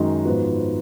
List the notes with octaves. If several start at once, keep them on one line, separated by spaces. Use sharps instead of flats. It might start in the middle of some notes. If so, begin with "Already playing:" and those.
Already playing: F#2 D#3 G#3 D#4 F#4
G#2 F3 B3 F#4